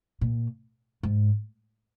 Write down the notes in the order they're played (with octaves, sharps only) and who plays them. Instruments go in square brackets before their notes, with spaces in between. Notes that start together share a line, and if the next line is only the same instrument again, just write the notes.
[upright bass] A#2
G#2